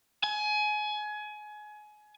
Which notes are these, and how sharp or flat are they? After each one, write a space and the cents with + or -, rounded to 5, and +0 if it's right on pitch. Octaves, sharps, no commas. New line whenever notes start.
G#5 +25